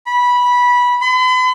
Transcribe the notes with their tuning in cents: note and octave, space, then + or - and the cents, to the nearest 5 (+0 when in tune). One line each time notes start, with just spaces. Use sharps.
B5 -15
B5 +45